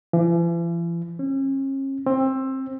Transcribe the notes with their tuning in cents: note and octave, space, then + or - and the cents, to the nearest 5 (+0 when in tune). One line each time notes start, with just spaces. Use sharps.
E3 +45
C#4 -40
C4 +20